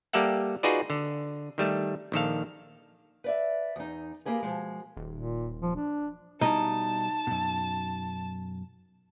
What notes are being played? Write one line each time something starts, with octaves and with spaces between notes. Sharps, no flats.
G3 A#3 G4 A4 E5 F#5
D#4 F4 F#4 G#4 B4 D5
D3
D#3 G3 A3
A#1 D#3 A4 F5
B4 D5 E5
E2 D#4
A#3 G4 G#4 B4
B2 F3 G#3
D#1
A#2
F3
D4
B2 G3 D#4 E4 A5
F#2 B2